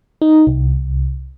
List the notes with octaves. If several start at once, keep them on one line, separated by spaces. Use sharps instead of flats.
D#4
C2